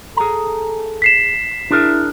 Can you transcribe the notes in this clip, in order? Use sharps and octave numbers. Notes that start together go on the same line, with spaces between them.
G#4 A4 A#5
B6 C7 E7
D4 E4 G#4 A#4